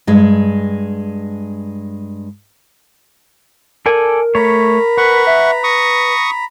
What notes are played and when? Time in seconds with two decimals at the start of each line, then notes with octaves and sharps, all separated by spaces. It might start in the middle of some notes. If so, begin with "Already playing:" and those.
0.07 G2 G#3
3.86 A4 A#4 D5 G#5
4.35 A3 C#5 A#5 B5
4.98 B4 F#5 C#6
5.27 E5
5.64 C#6 D#6 A#6